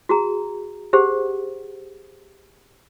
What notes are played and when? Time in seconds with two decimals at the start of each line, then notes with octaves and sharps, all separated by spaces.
0.09 F#4 G#4 A#5
0.93 G4 G#4 C5 F#5